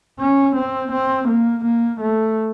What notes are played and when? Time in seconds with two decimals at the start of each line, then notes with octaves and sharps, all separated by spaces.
0.19 C#4
0.55 C4
0.91 C4
1.28 A#3
1.64 A#3
2.00 A3